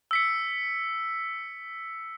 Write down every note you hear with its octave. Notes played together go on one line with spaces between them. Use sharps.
E6 B6 C#7